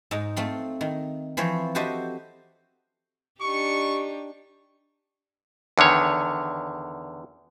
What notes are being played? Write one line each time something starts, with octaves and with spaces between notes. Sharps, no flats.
G#2 D#4
A3 C4 F4
D#3
E3 F3 C4 C5 C#5
F#4 G4 A4 C5 D#5 E5
D4 D#4 G4 C#6
E2 D3 D#3 C#5